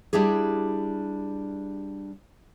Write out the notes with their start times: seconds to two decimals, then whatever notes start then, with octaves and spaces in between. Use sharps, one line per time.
0.13 G3 D4 E4 G4 G#4